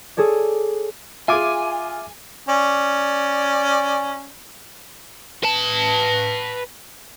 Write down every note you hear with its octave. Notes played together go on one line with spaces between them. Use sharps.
G#4 A4 C#5 D5
F4 G#4 E5 G#5 D6
C#4 D5
B4 A5